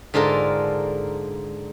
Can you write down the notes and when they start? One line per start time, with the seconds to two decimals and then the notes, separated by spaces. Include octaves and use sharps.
0.14 G#2 D3 F4 A4 A#4